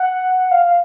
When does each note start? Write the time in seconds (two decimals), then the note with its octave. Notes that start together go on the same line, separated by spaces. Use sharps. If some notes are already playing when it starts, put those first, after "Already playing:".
Already playing: F#5
0.51 F5
0.63 F5